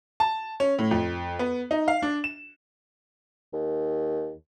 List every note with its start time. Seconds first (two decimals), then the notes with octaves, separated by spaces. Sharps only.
0.20 A5
0.60 C#4
0.79 A2
0.91 F2
1.39 B3
1.71 D#4
1.88 F5
2.02 D4
2.24 E7
3.53 D#2